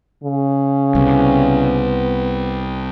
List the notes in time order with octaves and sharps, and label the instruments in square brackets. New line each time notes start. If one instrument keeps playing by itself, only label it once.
[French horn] C#3
[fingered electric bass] C2 [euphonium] B3